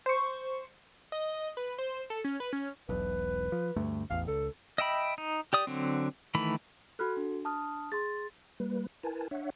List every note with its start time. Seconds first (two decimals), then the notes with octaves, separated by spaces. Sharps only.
0.06 C5 C#6
1.12 D#5
1.57 B4
1.78 C5
2.10 A4
2.24 C#4
2.40 B4
2.53 C#4
2.89 E1 B1 B4
3.52 F3
3.76 D2 G2 A3
4.10 A1 E2 F5
4.28 C#2 A4
4.78 D#5 E5 G5 B5
5.18 D#4
5.53 G4 D5 D#6
5.67 D3 F#3 C4
6.35 D#3 E3 A3 B5
6.99 F#4 A4 B5 F6 F#6
7.17 D4
7.45 A5 D#6 F6
7.92 G#4 C6 A6
8.60 G3 A#3 B4
9.03 E4 A#4 B4 G#5 A5
9.31 D4 C#5 E5 F#5